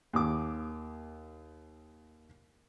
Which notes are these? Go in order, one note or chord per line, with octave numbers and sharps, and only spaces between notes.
D#2 D6